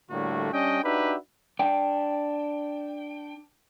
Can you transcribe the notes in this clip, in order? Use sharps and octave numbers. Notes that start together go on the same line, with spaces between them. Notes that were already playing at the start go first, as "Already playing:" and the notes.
A2 D3 G3 A3 A#3 F#4
G3 C#4 D4 D#5 G5
D4 D#4 F#4 G4 B4 E5
D4 G5